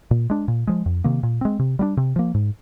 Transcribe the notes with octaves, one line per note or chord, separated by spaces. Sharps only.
A#2
G#3 D4
A#2
F3 G#3
F2
C3 D#3 A#3
A#2
G#3 C4
C3
G3 A#3 D4
C3
F3 A#3
G#2